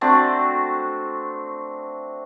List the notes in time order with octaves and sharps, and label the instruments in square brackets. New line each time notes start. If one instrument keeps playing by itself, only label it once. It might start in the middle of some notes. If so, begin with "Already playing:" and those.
[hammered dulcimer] A3 C4 D4 F#4